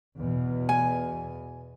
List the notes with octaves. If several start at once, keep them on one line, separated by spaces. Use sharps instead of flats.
E2 B2
G#5